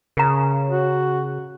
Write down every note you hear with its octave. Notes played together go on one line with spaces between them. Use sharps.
C#3 A#4 A#5
F#4